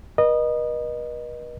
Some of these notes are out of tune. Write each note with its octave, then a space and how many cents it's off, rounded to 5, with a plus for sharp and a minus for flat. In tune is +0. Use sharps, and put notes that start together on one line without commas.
B4 -45 D#5 -20